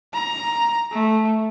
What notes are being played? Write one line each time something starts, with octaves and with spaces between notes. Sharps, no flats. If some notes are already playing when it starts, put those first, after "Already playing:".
A#5
A3